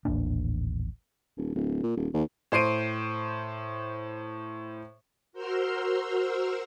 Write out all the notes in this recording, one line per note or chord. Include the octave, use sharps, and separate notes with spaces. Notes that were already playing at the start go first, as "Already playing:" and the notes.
D#1 A1 A#3 D4
D#1
D1
A#2
D#1
D#2
A2 C5 C7 D7 D#7
F#4 A#4 C5 C6 E6 F6